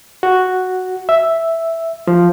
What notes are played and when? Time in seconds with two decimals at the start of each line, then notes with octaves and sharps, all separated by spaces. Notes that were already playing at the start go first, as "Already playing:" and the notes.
0.23 F#4
1.09 E5
2.07 F3